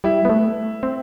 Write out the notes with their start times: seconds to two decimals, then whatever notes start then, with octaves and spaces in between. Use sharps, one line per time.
0.04 G3 E4
0.25 B3
0.30 A3
0.83 C4